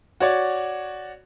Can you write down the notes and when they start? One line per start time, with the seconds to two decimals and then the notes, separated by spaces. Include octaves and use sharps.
0.20 F#4 C#5 D5